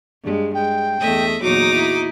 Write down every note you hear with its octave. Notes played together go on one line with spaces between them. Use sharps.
G2 G#3
G#3 G5
E2 A3 D#5 E5
E2 A#2 F#3 D#4 F#4 D6
E4